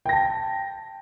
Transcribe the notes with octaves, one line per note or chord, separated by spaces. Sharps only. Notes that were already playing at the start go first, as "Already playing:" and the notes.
G5 A5 A#6